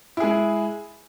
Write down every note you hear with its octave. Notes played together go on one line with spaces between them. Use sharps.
G#3 E4 G#4